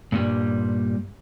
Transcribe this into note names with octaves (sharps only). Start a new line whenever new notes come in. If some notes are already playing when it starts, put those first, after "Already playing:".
G2 A#2 G3